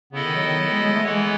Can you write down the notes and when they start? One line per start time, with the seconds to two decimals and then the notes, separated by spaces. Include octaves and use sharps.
0.12 C#3 B3 E4 A4 D#5
0.24 D#3
0.35 F#3
0.48 D#3
0.59 F#3
0.71 G#3
0.82 G#3
0.93 A3
1.04 E3 G#3 B3 E4 A4 C#5